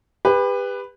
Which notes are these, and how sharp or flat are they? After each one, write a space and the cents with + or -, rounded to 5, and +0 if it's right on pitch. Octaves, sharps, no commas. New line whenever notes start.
G4 +35 B4 +0